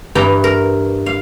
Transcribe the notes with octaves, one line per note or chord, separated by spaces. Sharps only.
G2 E3 G5 A#5
A#4
F5